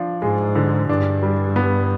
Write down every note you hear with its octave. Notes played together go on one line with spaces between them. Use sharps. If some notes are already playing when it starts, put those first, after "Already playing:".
Already playing: F3 D4
G#2 G#3
D3
G2 D4
G3
B3